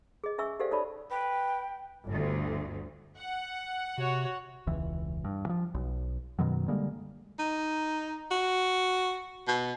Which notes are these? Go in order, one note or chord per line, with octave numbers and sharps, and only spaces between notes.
G#4 D#5
C#4 G#4 E5 G#5 C#6 E6
G4 A4 C5 D5 F5 G5
D#4 A4 C#5 D5 A5 B5
B4 G5
G1 D2
F#5
C3 F#4 C#5
E1 C#2 E3
G2
E3 F3
B1
F#2 B2 D#3 F#3
D3 G3 G#3 A#3
D#4
F#4
B2